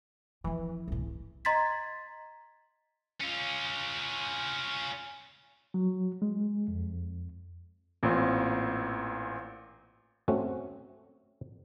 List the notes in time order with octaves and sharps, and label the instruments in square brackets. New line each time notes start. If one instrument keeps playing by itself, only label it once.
[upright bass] F2 F3 [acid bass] E3
[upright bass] C2 A2
[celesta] D#5 A#5 C6 G#6 A6 B6
[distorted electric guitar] C#4 F4
[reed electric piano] F#3
G#3
F2
[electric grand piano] A1 A#2 C4
[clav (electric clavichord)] A3 C4 C#4 F#4